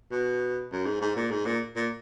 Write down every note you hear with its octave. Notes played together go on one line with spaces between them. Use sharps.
B2
F#2
G#2
G#2
A#2
G#2
A#2
A#2